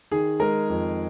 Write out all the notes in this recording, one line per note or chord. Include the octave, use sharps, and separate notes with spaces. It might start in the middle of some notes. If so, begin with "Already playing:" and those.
D#3 G#4
G#3 A#4
F2